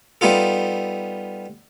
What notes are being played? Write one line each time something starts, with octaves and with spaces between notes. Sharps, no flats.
G3 B3 D#4 F4 A4